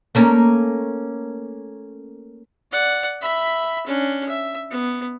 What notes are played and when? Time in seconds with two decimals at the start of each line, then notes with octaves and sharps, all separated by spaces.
0.15 A3 A#3 C#4
2.72 D5 F#5
3.21 E5 B5
3.87 C#4 D4
4.29 E5
4.71 B3